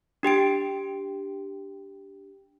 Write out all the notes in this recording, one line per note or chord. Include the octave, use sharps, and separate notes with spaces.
D4 G4 G5 D7